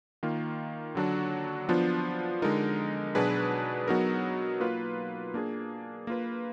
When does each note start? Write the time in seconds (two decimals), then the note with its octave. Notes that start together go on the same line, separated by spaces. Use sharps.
0.23 D#3 A#3 F4
0.95 D3 F#3 D4 F#4
1.69 F3 B3 D4 F4
2.42 D3 G#3 D#4 A#4
3.15 B2 F#3 D4 G#4 B4
3.88 F#3 B3 D#4 F#4 A#4
4.60 A#3 F4 B4
5.34 A#3 D4 G#4
6.07 A#3 F4 B4